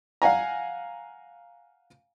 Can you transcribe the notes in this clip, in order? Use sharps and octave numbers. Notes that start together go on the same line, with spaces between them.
F5 F#5 G#5 A#5